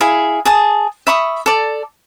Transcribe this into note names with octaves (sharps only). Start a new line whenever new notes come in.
E4 G#4 F5
G#4 A5 D#6
E5 B5 C#6 D#6
A4 D5